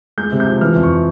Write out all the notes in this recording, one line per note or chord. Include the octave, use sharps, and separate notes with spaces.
G#3 G6
C3
G6
F3
E3 F6
F2
C#6